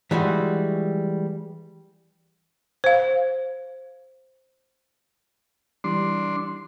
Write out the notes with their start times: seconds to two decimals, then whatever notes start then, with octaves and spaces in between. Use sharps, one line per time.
0.11 E3 G3 G#3 F#4
2.84 C5 F5
5.84 E3 G3 D4 C6